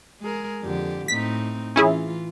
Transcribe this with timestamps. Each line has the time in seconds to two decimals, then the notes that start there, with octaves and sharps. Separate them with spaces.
0.21 G#3 G#4 A#4
0.62 F2 D3 G4
1.08 A2 C4 D#4 B6
1.76 E3 C#4 E4 F4 G#4